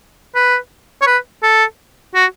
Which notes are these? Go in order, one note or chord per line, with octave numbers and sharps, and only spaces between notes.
B4
C#5
B4
A4
F#4